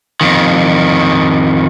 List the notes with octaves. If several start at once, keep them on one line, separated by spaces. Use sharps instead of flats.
F2 D#3